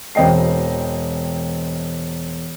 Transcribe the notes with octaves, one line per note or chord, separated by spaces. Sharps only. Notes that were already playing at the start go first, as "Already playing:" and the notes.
E1 C4 D#5 G5 C7